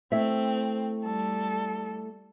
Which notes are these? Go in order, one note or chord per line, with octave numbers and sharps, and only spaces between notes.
A3 C4 E4 E5
G3 A4